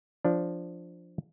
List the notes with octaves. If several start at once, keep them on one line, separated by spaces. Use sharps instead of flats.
F3 D4